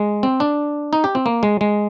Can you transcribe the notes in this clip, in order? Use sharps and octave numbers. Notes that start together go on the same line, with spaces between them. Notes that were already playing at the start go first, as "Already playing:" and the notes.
Already playing: G#3
C4
D4
D#4
G4
C4
A#3
G#3
G#3